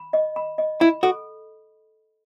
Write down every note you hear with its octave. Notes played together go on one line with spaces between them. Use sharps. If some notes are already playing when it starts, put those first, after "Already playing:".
Already playing: B5
D#5
B5
D#5
E4 B5
F#4 A4